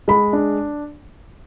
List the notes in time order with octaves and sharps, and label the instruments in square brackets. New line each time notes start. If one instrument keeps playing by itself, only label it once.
[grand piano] G#3 [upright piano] B5
[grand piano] D4